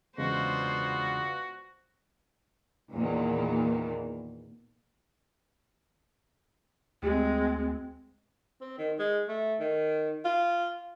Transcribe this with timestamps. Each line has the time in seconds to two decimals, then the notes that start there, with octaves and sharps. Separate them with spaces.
0.18 E2 C#3 G#3 B3 D4 F4 F#4 C5
2.92 E2 A#2 D#3
7.02 D2 G#3 C4
8.61 C4
8.78 D#3
8.99 G#3
9.28 A3
9.60 D#3
10.25 F4